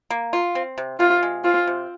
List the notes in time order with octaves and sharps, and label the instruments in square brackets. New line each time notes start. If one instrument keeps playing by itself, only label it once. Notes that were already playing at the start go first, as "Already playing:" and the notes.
[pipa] A#3
F4
C4
C3
[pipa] C3 [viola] F4
[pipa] G#3
[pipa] C4 [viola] F4
[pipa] C3